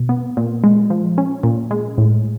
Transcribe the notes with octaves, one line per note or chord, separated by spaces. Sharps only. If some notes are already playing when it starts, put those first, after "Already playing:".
Already playing: B2
B3
A#2
G#3
F3
C#4
A#2
G#3
A2